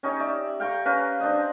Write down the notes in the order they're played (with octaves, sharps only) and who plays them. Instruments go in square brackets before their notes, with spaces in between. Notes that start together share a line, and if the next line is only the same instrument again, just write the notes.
[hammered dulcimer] C#4 D#4 G4 C#5
D5 E5
F5 G5 A#5 C#6
C#4 B4 F5 A#5
D4 C5 D#5